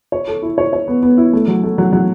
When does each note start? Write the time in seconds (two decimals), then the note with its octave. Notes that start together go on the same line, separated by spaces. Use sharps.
0.12 C#5
0.28 A4
0.42 E4
0.58 C#5
0.73 C#5
0.88 B3
1.03 B3
1.17 E4
1.33 A3
1.48 F#3
1.63 A3
1.78 F#3
1.93 F#3